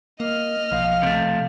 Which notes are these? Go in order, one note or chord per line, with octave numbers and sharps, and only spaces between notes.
A#3 D#5 F6
B1 F3 F5
C3 A3